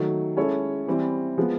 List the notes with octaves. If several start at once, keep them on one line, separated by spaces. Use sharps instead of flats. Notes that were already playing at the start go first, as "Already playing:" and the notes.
Already playing: D#3 F#3 A3
G#3 C#4 E4 A4 C#5
E3 G3 C4 E4
F3 G#3 B3